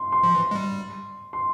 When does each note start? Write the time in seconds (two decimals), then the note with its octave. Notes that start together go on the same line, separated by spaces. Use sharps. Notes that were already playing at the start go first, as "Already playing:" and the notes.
Already playing: C6
0.12 C6
0.23 F3
0.35 E3
0.51 G#3
0.55 G3
1.33 C6